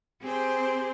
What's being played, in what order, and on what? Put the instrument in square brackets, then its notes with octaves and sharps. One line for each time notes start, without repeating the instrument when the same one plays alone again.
[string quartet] C4 G4 G#4 C5